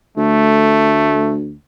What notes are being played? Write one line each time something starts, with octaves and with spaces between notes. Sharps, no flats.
D2 A3